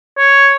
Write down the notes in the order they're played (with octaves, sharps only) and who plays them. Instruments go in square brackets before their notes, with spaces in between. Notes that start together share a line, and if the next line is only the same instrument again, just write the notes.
[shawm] C#5